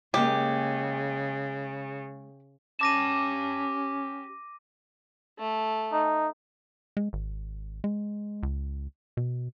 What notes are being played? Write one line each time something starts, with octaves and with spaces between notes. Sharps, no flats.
C#3 G#3 A#3 G4
C#4 G4 A5 D6 A#6 D#7
A3
D#4
G#3
G#1
G#3
C#2
B2